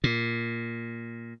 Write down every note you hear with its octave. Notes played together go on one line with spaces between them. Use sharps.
A#2